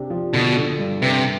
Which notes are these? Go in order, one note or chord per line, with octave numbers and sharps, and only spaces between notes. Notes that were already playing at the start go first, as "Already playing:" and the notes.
Already playing: C3 D4
F3
B2 D3
D3
G2
C3 B4